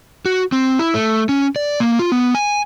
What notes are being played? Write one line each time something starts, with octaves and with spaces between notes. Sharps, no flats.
F#4
C4
E4
A3
C#4
D5
A#3
F4
B3
G#5